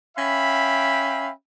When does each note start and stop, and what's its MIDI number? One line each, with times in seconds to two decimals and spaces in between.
0.17 1.30 61
0.17 1.30 76
0.17 1.30 77
0.17 1.30 79
0.17 1.30 83